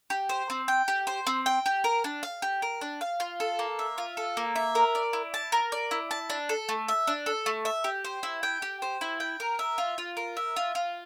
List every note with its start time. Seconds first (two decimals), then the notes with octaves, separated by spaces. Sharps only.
0.10 G4
0.29 C5
0.50 C4
0.68 G5
0.88 G4
1.07 C5
1.27 C4
1.46 G5
1.66 G4
1.84 A#4
2.04 D4
2.23 F5
2.42 G4
2.62 A#4
2.81 D4
3.01 F5
3.20 F4
3.40 A4
3.59 A#3
3.79 E5
3.98 F4
4.17 A4
4.37 A#3
4.56 E5
4.75 A#4
4.95 D5
5.13 E4
5.34 A5
5.52 A#4
5.72 D5
5.91 E4
6.11 A5
6.30 D4
6.49 A4
6.69 A3
6.88 E5
7.07 D4
7.26 A4
7.46 A3
7.65 E5
7.84 G4
8.04 C5
8.23 E4
8.43 G5
8.62 G4
8.82 C5
9.01 E4
9.20 G5
9.40 A#4
9.59 E5
9.78 F4
9.98 F4
10.17 A#4
10.37 E5
10.56 F4
10.75 F4